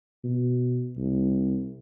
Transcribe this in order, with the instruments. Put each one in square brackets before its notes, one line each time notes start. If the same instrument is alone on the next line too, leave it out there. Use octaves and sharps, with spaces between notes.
[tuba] B2
C2